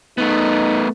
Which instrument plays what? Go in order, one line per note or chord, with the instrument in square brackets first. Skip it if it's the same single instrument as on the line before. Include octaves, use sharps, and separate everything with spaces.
[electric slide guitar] A3 B3 [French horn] D#4